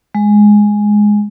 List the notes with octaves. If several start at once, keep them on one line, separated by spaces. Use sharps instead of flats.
G#3